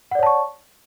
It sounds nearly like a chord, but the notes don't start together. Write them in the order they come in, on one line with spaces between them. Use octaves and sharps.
F#5 D5 C#5 A5 C#6